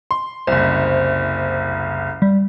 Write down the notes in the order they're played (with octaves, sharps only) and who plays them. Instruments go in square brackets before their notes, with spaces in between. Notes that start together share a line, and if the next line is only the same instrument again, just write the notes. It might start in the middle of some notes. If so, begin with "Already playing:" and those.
[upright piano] C6
[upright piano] F#1 C2 [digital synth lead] C5
[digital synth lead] G3